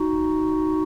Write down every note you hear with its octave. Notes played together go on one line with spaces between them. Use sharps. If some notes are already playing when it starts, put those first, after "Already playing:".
Already playing: D#4 F#4